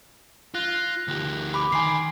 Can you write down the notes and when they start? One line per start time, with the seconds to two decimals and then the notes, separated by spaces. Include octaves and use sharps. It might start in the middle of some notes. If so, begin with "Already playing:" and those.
0.55 F4 F#6 A#6
1.08 D2 G4
1.54 B5 D6
1.72 D#3 G#5 C6 C7